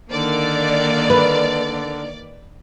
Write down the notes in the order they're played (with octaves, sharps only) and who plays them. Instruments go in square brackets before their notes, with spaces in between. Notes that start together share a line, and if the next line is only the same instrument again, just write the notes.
[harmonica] D3 [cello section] D#3 A#3 A#4 [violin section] D5
[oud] B4